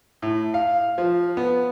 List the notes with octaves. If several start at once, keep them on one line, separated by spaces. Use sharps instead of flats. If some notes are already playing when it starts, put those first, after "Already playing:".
A2
F5
F3
B3